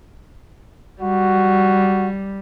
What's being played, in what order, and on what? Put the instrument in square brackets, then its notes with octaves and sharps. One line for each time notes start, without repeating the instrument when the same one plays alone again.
[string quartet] G3 [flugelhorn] F#4